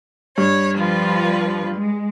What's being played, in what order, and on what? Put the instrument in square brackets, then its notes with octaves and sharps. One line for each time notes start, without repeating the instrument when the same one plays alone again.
[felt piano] G2 [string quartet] C#5
[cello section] F3 [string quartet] G3 F4 B4
[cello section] G#3